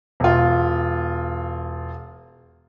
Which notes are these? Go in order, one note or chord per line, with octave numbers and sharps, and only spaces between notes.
E1 F4